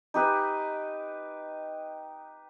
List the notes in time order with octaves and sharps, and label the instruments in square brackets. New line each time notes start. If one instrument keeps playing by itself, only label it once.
[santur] D#4 G4 B4